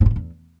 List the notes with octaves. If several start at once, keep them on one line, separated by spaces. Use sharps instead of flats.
G#2
A2
A#2
E2